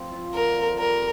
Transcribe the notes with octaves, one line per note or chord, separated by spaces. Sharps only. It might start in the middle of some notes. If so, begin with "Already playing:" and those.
Already playing: F3 C4
F4
D3 A#4
F3
G3 A#4